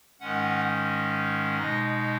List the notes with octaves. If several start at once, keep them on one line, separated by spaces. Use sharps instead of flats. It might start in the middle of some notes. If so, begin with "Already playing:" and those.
G#2 D#3 G#3 C#4 F#5
B2 G#3 D#4 D#5